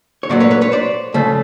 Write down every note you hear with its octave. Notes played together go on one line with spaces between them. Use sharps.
C#5
A#2 F#3 A3 C5 D5
B4 C#5
B4 C#5
B4 C#5
C5 D5
C#3 F3 A3